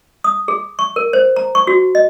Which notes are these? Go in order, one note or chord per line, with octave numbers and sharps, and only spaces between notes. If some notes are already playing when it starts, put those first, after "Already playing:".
D#6
G#4
C#6
A#4
C5
A#5
C#6
F#4
D#5